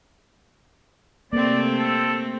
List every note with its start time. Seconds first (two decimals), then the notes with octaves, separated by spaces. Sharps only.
1.33 C3 A3 A#3 C4 D5
1.79 A4